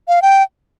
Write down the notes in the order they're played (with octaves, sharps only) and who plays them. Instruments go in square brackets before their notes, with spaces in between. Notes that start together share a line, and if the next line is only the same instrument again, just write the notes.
[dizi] F5
G5